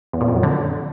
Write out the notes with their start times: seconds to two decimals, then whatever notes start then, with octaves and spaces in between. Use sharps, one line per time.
0.13 E2
0.21 A#2
0.28 F2
0.36 F#2
0.43 D3